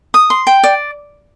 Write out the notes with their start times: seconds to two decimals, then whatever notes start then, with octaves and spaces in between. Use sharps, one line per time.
0.14 D#6
0.30 C6
0.47 G5
0.63 D5